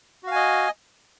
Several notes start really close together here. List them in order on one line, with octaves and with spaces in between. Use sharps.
F#4 F5 G#5 D#5